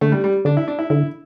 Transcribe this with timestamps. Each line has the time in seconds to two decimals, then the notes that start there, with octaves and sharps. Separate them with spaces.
0.01 D3 A3
0.12 G3
0.24 G3
0.45 D3 D4
0.57 E4
0.68 D4
0.79 E4
0.90 D3 E4